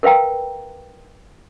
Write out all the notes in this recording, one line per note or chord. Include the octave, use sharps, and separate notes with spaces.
A#4 B4 F5 G5 A#5